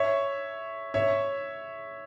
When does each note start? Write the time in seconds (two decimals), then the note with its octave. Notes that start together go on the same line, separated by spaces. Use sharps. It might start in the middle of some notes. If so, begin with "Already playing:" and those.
Already playing: C#5 E5
0.94 C#5 E5